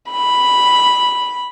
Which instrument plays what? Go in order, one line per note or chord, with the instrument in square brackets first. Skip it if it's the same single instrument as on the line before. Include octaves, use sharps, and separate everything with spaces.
[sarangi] B5